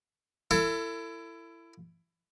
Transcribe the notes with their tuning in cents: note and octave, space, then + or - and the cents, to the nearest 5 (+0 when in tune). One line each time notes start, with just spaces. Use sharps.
E4 +20 A4 +35